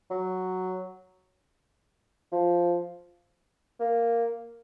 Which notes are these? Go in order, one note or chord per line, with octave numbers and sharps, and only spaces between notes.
F#3
F3
A#3